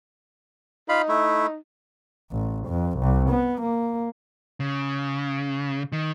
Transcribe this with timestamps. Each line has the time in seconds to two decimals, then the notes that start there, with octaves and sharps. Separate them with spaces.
0.89 D#4 F4 F5 B5
1.08 A3 E4
2.32 A1
2.67 F2
2.98 C2
3.29 B3
3.61 A#3
4.60 C#3
5.92 D#3